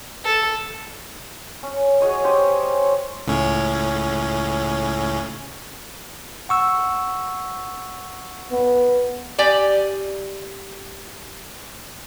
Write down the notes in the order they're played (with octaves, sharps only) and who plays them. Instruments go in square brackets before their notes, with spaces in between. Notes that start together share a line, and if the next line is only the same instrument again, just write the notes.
[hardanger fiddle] A4
[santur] C#4
F#4 G#4 C#5 D#5
C#4 G4 C5 C#5
[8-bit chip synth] C#2 A2 C#4
[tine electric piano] F#5 C#6 E6
[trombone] B3
[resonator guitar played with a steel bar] G4 D5 G#5